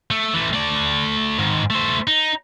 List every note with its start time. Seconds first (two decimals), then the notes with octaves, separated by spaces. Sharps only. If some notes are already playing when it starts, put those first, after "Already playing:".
0.11 A3
0.34 E3 A3
0.53 A3 D5
1.38 G#2 D#3
1.70 A3 C5
2.08 D#4